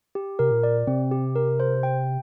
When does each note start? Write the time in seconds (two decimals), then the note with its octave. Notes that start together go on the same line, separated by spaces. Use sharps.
0.15 G4
0.39 C3 A#4
0.51 A#2
0.63 D5
0.87 C3 C4
1.12 G4
1.36 A#4
1.60 C5
1.83 G5